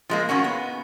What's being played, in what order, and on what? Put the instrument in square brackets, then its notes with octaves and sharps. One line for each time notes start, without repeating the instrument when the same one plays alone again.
[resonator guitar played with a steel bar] F3 G#3 A#3
D#3 A#3 C#4 F#4
B3